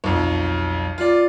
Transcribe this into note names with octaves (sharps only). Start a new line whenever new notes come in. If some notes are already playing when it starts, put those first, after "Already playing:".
B1 F2
F4 D5